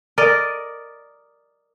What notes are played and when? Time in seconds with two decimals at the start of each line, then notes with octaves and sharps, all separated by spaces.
0.18 A#4 D5 D#5